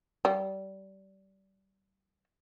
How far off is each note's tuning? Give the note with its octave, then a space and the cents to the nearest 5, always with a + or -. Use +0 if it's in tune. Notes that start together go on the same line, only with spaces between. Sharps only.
G3 -25